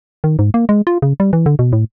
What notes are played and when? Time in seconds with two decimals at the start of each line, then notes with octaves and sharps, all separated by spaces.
0.24 D#3
0.39 G#2
0.54 A#3
0.69 G#3
0.87 F4
1.02 C#3
1.20 G3
1.33 E3
1.46 D3
1.59 B2
1.73 A2